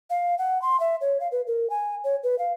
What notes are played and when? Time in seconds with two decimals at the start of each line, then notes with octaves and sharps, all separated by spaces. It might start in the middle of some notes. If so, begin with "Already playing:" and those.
0.10 F5
0.38 F#5
0.62 C6
0.80 E5
1.01 C#5
1.20 F5
1.32 B4
1.47 A#4
1.70 G#5
2.04 C#5
2.23 B4
2.39 F5